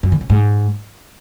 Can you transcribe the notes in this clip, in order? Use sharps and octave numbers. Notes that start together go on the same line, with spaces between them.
F#2
D#3
C#3
G#2